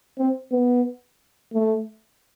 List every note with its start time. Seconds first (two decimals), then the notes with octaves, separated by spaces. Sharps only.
0.18 C4
0.52 B3
1.54 A3